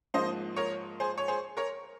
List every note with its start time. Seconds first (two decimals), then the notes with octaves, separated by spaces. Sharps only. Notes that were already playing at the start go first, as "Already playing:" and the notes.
0.14 G#2 F3 A#3 C5 D#5
0.56 A#4 C#5
1.00 G#4 C5
1.18 C#5
1.28 G#4 C5
1.57 A#4 C#5